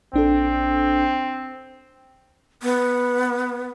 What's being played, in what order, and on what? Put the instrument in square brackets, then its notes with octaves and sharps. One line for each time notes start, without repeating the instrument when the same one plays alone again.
[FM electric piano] A#1 D4 A4 [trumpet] C4
[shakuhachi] B3